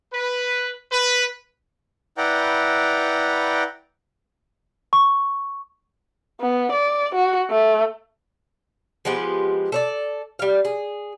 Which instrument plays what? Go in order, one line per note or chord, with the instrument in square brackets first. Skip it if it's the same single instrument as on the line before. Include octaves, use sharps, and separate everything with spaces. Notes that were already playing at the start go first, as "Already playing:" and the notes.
[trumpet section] B4
B4
[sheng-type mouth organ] E4 B4 D5 F#5 G5 A#5
[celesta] C#6
[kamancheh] B3
D5
F#4
A3
[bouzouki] F3 G#3 B3 G4
A4 C#5 D5
G3 F5
G#4